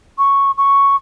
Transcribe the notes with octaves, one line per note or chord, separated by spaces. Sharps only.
C#6
C#6